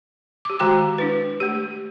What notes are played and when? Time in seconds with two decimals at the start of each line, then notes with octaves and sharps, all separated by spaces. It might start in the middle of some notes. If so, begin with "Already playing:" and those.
0.45 G4 D6
0.59 D#3 G#3 F#4 G5 A#5 D6
0.98 D4 E4 B4
1.40 A3 G4